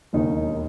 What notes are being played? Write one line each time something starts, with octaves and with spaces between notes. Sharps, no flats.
E1 D#2 D#3 D#4